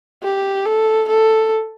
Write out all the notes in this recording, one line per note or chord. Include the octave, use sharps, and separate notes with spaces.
G4
A4
A4